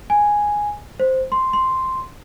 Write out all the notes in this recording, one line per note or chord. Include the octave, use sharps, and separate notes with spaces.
G#5
C5
C6
C6